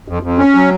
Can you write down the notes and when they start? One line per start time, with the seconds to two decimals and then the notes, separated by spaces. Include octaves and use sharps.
0.08 F2
0.23 F2
0.38 C#4
0.55 F#3